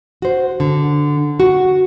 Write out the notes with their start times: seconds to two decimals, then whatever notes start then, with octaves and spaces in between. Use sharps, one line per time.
0.22 F#4 C5
0.60 D3
1.40 F#4